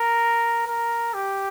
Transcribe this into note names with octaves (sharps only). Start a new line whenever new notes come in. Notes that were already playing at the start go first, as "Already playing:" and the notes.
Already playing: A#4
A#4
G4